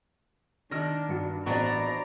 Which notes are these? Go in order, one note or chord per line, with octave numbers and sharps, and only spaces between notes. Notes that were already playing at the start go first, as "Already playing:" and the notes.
D#3 D4 F6 A#6
G2 F#4 C#7
A1 B3 C4 D4 F#4 D5 A#5